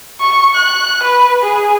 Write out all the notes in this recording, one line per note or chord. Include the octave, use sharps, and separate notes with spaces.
C#6
F#6
B4
G#4